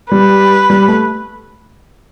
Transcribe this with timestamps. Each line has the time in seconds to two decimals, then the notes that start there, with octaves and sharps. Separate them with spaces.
0.12 G3 B4
0.70 G3
0.88 A3